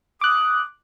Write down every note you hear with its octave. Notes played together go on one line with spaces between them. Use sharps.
D6 D#6 F#6